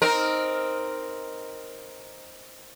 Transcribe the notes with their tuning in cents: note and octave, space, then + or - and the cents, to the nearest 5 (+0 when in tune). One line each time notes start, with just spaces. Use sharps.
C4 +0 D#4 +0 A#4 +0